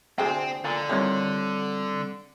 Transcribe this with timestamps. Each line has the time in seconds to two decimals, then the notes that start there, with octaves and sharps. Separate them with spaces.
0.18 D2 C3 C4 D4 G#4 C5 G5
0.64 A#2 D3 A6
0.89 D#2 A2 G3 A#3 C4 F4 C#5 G6